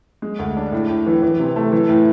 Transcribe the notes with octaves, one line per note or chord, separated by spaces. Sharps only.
G#3
D2
D4
A2
A2
E3
E3
C3
A3
E3
A2